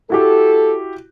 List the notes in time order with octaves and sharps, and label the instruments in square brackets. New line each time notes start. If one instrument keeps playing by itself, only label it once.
[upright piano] E4 F#4 G4 [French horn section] A4